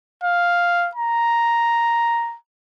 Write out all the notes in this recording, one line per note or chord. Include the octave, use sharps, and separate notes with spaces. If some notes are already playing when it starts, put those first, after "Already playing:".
F5
A#5